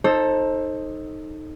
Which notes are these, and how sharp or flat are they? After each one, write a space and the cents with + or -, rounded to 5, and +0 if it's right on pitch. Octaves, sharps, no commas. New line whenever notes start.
D#4 +0 A4 +0 C5 +25